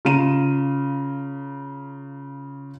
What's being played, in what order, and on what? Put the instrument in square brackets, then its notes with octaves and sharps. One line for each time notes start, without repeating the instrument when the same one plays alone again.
[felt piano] C#3 F4 A#5 D#7 E7